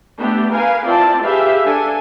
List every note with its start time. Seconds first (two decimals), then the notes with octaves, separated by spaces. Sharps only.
0.18 A3 B3 D4 G4
0.52 A#4 B4 F5 G#5
0.85 C4 E4 F4 D5 A5
1.23 G4 G#4 B4 E5 F5
1.64 D4 A4 G#5